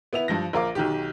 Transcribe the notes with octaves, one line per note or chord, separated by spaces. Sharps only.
B3 E4 F7
G2 F3 A#6
A#1 A#4 F5 D6
B1 D#3 G4